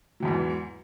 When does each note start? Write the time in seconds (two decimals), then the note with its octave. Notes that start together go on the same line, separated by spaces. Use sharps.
0.20 F#3
0.23 E2
0.25 G#2
0.28 E3